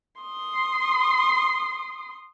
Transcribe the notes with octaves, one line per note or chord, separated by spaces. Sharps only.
C6 D#6